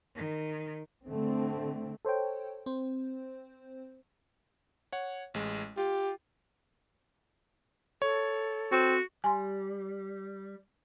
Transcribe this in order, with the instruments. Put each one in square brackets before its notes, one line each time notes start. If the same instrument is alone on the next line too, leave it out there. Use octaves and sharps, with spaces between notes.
[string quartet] D#3
[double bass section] D3 A3 C4
[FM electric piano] A4 C5 C#5 G5
C4 C5
[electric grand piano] C#5 F#5
A1 G#3
[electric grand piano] F4 [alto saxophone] G4
[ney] A4 [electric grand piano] C#5
[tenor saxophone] C4 [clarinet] F#4
[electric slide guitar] G3 [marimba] G#5 C6